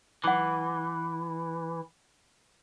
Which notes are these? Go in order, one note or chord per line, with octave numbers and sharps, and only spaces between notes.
E3 F#5 D6